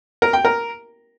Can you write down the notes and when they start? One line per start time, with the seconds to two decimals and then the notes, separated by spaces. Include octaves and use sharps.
0.22 A#4
0.33 G5
0.45 A#4